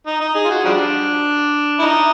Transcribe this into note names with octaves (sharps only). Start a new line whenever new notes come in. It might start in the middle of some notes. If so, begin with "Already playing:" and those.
D#4
D#4
G#4
F4
F#4
F3 G3 D4
E4
D#4